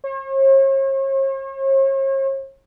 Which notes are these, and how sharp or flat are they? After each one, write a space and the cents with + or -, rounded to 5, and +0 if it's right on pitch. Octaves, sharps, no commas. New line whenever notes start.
C#5 -45